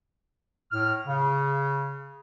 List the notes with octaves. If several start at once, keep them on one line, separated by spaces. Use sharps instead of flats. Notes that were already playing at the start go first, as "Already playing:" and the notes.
A2 F6
C#3